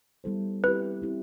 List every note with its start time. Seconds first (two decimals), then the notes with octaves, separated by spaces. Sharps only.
0.24 G3 B3 E4 A4 C5
0.64 C4 E4 G4 B4
1.02 C4 E4 G4